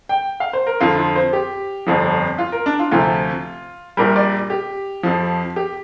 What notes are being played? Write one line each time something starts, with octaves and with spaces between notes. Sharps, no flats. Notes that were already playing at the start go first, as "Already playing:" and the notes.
G5
F5
C5
A#4
F2 D3 F3 F4
F4
C5
G4
G1 F2 F3
F4
A#4
D4
F4
D2 C3 F3 F4
A#1 A#2 G3 A#4
D5
G4
F2 F3
G4